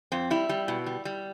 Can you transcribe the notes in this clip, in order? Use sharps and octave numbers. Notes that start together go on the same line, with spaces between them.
F2 C4
G3 E4
G3
B2
G3
G3